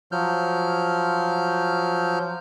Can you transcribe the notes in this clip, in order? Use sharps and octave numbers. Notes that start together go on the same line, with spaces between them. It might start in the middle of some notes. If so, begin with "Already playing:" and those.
F3 F#3 F6 G6